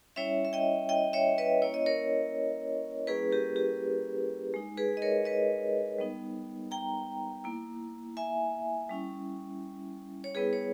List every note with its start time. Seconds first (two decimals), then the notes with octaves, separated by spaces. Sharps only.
0.16 G3 C#4 E4 C#5 E5
0.45 E5
0.53 D#5 G5
0.89 D#5 G5
1.13 C#5 E5
1.38 B4 D#5
1.62 A#3 C#4 E4 C#5
1.74 D#5
1.86 A#4 C#5
3.07 G3 A#3 C#4 E4 G#4 B4
3.31 G4 A#4
3.56 G4
4.54 G#3 D#4
4.77 G#4 B4
4.97 D#5
5.02 A#4 C#5
5.25 B4 D#5
5.98 G3 B3 D#4
6.71 G5 A#5
7.44 A#3 E4
8.17 E5 G#5
8.89 G3 C#4 E4
10.24 C#5
10.35 G3 B3 E4 G#4 B4
10.53 C#5